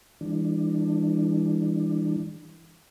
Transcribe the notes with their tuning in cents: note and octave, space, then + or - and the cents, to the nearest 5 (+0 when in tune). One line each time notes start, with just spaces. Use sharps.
E3 +0 G#3 -45 D4 +20